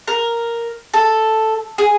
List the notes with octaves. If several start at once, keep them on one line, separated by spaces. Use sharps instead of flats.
A#4
A4
G#4